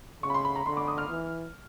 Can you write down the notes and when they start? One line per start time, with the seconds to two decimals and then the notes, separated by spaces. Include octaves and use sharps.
0.23 C#3 C#6
0.30 B5
0.34 C6
0.45 B5
0.56 A#5
0.66 D3 C6
0.77 D6
0.88 D#6
0.98 F6
1.09 E3